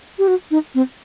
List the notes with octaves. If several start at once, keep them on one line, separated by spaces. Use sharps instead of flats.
G4
F#4
D#4
C4